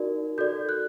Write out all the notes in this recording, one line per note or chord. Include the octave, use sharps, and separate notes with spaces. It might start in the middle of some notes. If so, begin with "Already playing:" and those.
Already playing: D#4 F#4 A#4 D5
F#4 A4 D5 G6
F#6